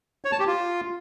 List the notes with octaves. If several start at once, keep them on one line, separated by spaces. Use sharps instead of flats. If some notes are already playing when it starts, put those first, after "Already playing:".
C#5
A5
G4
F4